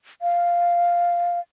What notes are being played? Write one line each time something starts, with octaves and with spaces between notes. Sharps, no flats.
F5